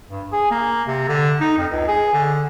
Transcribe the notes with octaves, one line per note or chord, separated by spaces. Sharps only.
G2
G#4
A#3
C3
D3
D#4
F2
C#2
G#4
D3